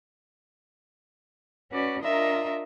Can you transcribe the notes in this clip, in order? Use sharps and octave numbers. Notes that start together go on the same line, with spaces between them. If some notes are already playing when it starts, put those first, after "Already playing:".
C#4 F#4 B4 D5
D4 F4 A#4 D#5 E5 A#5